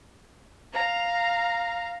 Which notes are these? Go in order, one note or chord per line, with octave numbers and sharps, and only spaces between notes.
F5 A#5